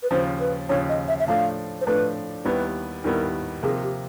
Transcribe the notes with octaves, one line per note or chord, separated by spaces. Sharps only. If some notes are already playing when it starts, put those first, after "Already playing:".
B4
D#2 C#3 F3 C5
B4
D#2 C#3 F3 C#5
D#5
E5
E5
A2 F3 A3 D4 F5
C5
A2 F3 A3 D4 B4
D#2 D#3 G3 B3 E4 B4
D#2 D#3 G3 B3 E4 A#4
C3 F3 A#3 G#4
G4